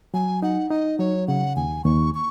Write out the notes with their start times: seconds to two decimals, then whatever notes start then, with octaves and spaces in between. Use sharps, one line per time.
0.14 F#3 G#5
0.42 D#4 F#5
0.70 D#4 D#5
0.99 F#3 C#5
1.28 C#3 F#5
1.56 D#2 G#5
1.85 D#2 C#6
2.14 C#6